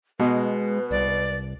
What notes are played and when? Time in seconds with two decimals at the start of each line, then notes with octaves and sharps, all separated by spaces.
0.20 B2 G#3 B4
0.91 C2 D5